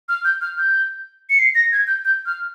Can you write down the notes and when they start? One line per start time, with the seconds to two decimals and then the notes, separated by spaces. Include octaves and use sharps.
0.09 F6
0.25 G6
0.41 F6
0.58 G6
1.30 C#7
1.39 C7
1.55 A#6
1.72 G#6
1.87 G6
2.05 G6
2.26 F6